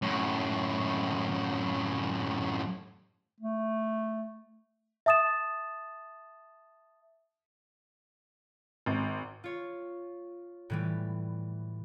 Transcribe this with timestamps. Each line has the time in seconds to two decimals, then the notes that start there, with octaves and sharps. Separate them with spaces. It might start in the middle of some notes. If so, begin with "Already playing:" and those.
0.02 F#2 A2
3.41 A3
5.06 E5 A5 D#6 A6 E7
8.86 G#1
9.44 F4 C#5
10.70 A2 E3 G3